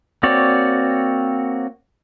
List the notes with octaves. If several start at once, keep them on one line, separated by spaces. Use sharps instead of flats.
A#3 C4 F#4 C#5 D5